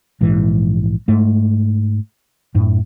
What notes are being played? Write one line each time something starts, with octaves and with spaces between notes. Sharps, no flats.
A#1 G#2 E3
G#2 A3
F#2 A2